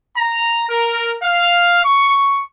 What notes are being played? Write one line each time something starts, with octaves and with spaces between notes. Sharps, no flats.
A#5
A#4
F5
C#6